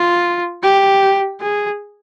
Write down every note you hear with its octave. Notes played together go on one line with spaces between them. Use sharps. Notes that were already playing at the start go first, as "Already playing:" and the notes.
Already playing: F4
G4
G#4